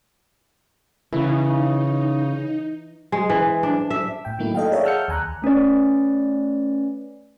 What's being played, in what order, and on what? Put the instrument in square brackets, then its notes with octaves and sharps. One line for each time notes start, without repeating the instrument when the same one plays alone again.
[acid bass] C#3 [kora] E3 [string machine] D#4
[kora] G#3
E3
D4
E5
[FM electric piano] A2 G5
D#3 F#3 A3 A#3 D#4 E4
A4 D#5 F5 G5
G#4 A#4 C#5 D5 E5 F5
F#5 A5 E6 F6 G6 C#7
D#2 G#5 A#5 F#6
[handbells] A3 C#4 B4 D5